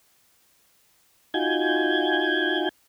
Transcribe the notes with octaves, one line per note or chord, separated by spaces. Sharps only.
D#4 F4 F#4 G#5 G6 G#6